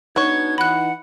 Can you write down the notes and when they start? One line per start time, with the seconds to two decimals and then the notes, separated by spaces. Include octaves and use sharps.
0.16 B3 D4 D#4 F#4 C#5 G#6
0.58 E3 D#4 F#5 B5 F#6